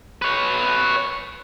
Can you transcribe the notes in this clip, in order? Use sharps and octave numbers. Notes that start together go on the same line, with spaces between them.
B4 C#5